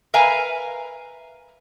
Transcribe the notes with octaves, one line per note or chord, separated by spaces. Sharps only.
A#4 B4 E5 F5 G#5 A#5